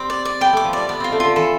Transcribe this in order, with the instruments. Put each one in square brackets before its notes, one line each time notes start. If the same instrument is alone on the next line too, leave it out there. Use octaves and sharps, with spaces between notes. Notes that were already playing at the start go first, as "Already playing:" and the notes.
Already playing: [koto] G3 C4 [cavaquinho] D6
[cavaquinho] D5
D5
[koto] B3 [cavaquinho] G5
[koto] A3 [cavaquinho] D6
[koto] F3
[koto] G3 [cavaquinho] D5
[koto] B3 [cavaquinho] D5
[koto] C4 [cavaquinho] F4
[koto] A3
[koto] D3 [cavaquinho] F4
[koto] E3 [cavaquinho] A4